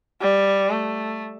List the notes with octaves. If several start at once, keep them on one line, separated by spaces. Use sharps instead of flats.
G3
A3